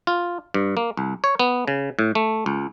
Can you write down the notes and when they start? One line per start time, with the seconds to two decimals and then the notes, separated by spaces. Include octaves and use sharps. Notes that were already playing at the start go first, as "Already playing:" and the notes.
0.07 F4
0.54 G2
0.77 A#3
0.97 C2
1.24 C#5
1.39 B3
1.68 C#3
1.99 A2
2.15 A3
2.46 C#2